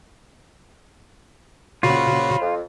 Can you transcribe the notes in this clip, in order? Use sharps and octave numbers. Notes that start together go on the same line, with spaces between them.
A#2 C#3 F4 F#4 C5 C#5 B5
F2